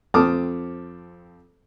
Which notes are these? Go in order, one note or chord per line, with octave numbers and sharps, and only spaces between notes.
F2 C4 A5 D6 D#6 F6